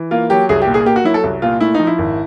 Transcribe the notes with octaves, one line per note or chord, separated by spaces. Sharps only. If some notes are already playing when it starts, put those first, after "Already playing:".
Already playing: E3
A#3 F4
F#3 G4
C2 G#4
G4
A#2
G#4
A#3 G4
F#4
F#3 E4
A4
C2
A#2 F4
A3 E4
F3 D#4
E4
G#1